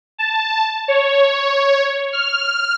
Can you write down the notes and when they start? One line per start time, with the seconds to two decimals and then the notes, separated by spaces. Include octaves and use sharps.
0.18 A5
0.88 C#5
2.13 F6